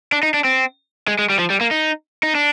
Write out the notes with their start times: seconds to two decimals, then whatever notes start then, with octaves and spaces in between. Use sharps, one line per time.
0.12 D4
0.23 D#4
0.34 D4
0.44 C4
1.08 G#3
1.19 G#3
1.30 G3
1.39 F3
1.50 G3
1.61 A#3
1.71 D#4
2.23 D#4
2.35 D4